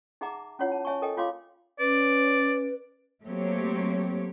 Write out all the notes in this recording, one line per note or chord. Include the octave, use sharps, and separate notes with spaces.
D#4 G#4 E5 F#5 A#5 D6
C#4 E4 F4 C#5 F#5
A5
C#5 E5 G#5 A5 C#6
A4 A#4 D#5 G5 G#5
F4 C#5 F5 C6 D6
C#4 B4 D5
F#3 A3 A#3 C4 G4 C#5